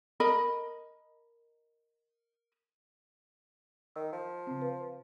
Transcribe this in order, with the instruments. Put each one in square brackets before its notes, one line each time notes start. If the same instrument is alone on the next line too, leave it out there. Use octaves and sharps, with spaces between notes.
[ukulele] A#4 D#5 B5
[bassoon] D#3 [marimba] E6
[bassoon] F3
[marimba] C#3 C4
B4